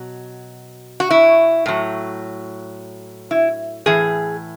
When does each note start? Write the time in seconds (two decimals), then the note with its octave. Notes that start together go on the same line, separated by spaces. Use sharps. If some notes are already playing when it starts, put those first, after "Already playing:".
Already playing: B2 F#3
1.00 F#4
1.11 E4
1.66 A2 F#3
3.31 E4
3.86 A2 E3 G#4